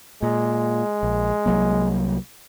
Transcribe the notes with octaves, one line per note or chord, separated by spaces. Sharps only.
A#2 G#3
A#1
C2 F#3 A#3